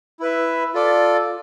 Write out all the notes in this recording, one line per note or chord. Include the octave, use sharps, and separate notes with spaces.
E4 B4 E5
F4 A4 D5